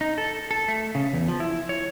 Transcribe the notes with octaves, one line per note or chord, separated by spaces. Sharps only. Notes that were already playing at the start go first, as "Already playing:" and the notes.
D#4
A4
A4
A3
C#3
E2
F3
E4
C#5